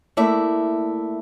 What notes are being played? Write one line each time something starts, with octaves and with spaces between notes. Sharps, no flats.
A3 A#3 E4 D5 E5